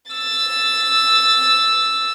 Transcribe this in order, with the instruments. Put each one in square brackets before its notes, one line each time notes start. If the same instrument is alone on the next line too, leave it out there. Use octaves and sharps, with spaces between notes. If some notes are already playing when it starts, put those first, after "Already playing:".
[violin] E6 A6